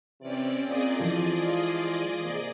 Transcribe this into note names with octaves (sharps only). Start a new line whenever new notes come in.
C3 E3 C4 C#4 D5
A#2 G#4 D5 D#5
E3 F3 G#3 F4 A4
G#2 C3 A#3